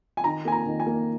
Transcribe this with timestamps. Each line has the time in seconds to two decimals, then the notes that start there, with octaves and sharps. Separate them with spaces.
0.17 G#5
0.24 D#3 A#5
0.45 A#3 G#5
0.52 A#5
0.66 D#3
0.80 G#5
0.87 A#3